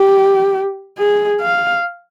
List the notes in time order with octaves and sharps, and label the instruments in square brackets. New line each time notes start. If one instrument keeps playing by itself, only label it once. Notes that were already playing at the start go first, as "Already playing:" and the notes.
Already playing: [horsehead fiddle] G4
G#4
F5